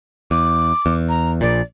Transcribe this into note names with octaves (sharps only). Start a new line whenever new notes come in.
E2 D6
E2
A#5
A#1 A#2 D5